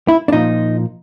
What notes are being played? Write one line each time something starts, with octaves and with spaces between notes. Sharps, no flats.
E4
D4
A#2 F3 D#4